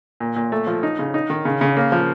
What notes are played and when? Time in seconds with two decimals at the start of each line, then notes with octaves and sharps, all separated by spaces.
0.20 A#2
0.36 A#2
0.52 A3
0.67 F3
0.83 D#4
0.99 C#3
1.14 D#4
1.30 D#3
1.45 C#3
1.61 C#3
1.76 A#3
1.92 F3